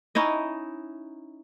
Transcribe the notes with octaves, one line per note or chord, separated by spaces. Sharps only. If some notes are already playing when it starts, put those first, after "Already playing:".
C#4 D#4 E4 D#5